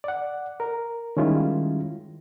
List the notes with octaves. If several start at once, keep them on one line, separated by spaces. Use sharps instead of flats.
D5 F#5
A#4
D#3 G3 G#3 C#4 E4 F4